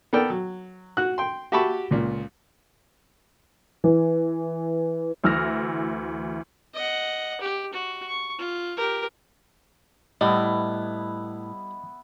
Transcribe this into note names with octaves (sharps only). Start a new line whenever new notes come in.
B3 A4 A#4 D5 G5
F#3
F#4 F#6
G5 C6
F#4 G4 E5 A5 B5 C#6
C#2 A#2
E3
D2 E3 E6 F6 A#6
D#5 F#5
G4
F#4
C#6
F4
G4 A#4
A2 G3 B3 E4 D#5